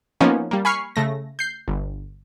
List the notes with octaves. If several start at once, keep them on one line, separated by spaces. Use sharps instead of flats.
F3 A#3 B3 C#4 D#4
G3 A#3
G#5 B5 C#6 F6 C7
C#3 A3 A#6
G6 C7
G1